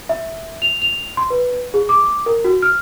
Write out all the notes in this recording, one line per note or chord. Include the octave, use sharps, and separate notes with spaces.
E5
F7
F7
C6
B4
G#4
D6
A#4
F#4
F6